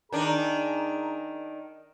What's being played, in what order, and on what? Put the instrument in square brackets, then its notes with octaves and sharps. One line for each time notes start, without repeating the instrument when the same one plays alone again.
[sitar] D#3 D4 [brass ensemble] G#4 A#5